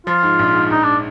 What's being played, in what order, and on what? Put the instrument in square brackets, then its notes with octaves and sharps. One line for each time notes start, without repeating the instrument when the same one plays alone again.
[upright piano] F3 [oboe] F4
[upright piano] G#2
A#1
G#2
[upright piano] A#1 [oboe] D#4
[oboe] D4